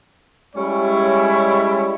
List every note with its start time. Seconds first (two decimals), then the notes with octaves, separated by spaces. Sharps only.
0.56 G3 G#3 C#4 E4 C#5